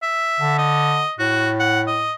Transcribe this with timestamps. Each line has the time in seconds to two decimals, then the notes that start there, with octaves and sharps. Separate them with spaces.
0.03 E5
0.40 D3
0.58 D#5
1.19 A2 F#4
1.60 F#5
1.87 D#5